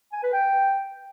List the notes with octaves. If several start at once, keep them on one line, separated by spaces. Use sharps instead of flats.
G#5
B4
G5